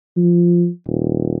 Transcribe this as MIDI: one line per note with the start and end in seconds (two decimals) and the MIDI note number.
0.17 0.68 53
0.87 1.37 27